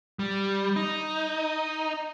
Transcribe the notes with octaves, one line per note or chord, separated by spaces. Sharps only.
G3
D#4